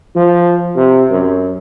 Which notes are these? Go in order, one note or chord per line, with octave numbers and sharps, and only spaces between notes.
F3
C3
F#2